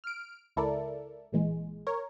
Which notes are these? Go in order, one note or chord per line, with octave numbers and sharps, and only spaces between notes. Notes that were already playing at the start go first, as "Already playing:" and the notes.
F6 D7
C#2 E4 A4 A#4 D5
A1 A#2 E3 G#3
A#4 C#5